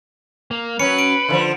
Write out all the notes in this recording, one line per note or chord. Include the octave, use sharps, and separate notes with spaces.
A#3
F#3 C#4 B4 C#7
D7
D3 E3 F3